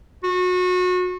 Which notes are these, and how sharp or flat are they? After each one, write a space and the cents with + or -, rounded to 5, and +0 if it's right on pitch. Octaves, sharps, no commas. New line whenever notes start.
F#4 -30